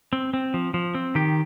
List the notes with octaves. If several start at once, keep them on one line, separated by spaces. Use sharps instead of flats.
C4
C4
F3
F3
C4
D#3 G4